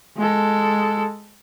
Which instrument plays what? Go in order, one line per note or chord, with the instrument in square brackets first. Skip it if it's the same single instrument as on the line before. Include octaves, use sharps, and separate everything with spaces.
[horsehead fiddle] G#3 A4